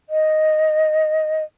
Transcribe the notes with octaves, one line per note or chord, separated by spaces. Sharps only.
D#5